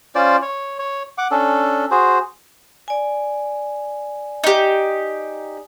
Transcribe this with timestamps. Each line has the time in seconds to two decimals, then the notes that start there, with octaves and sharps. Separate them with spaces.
0.15 C#4 F4 C5 D5
0.42 C#5
0.79 C#5
1.18 F#5 D6
1.31 C#4 D4 A4
1.91 F#4 G#4 C5
2.88 D5 G#5
4.44 D#4 G4